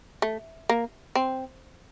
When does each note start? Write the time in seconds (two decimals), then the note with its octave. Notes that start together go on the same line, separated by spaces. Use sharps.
0.22 A3
0.69 A#3
1.15 C4